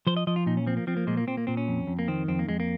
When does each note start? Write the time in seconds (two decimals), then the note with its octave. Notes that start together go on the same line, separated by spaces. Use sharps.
0.07 F3 C5
0.17 D#5
0.27 F3 D#5
0.36 F4
0.46 A#2 D#4
0.57 C#4
0.67 F3 C4
0.77 A#3
0.87 F3 C4
0.97 A#3
1.07 A#2 G#3
1.17 A#3
1.27 A#2 C4
1.37 A#3
1.47 A#2 C4
1.57 C#4
1.68 F2
1.87 F2
1.99 A#3
2.08 D#3 C4
2.28 F2 C4
2.39 A#3
2.48 F2 G#3
2.60 A#3